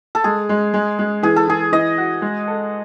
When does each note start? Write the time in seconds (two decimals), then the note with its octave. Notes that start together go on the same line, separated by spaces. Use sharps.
0.15 A4
0.24 G#3 G#4
0.49 G#3
0.74 G#3
0.99 G#3
1.23 E3 G#4
1.36 A4
1.47 E3 G#4
1.72 E3 D#5
1.98 F#4
2.22 G#3
2.48 A4